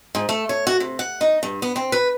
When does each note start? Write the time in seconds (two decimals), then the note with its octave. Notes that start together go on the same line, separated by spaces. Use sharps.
0.15 G#2
0.29 A3
0.49 C#5
0.67 F#4
0.80 C3
0.99 F#5
1.21 D#4
1.43 G2
1.62 B3
1.76 C4
1.92 B4